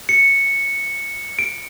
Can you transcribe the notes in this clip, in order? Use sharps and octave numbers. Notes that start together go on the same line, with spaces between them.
C#7
D7